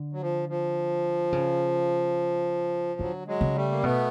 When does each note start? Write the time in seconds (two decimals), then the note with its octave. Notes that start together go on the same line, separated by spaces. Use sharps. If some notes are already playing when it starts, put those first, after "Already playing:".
Already playing: D3
0.13 F#3
0.22 F3
0.49 F3
1.33 C#3
2.99 D3 F#3
3.27 F#3 G#3
3.41 C#3
3.55 G3 A3
3.71 A#3
3.83 B2 A3 B3